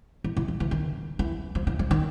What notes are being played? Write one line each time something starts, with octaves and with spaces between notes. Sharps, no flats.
E3
E3
F3
E3
D#3
E3
F3
E3
F3
D#3